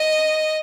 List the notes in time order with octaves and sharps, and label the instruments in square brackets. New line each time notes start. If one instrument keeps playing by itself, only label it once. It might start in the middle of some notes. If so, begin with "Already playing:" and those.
Already playing: [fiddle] D#5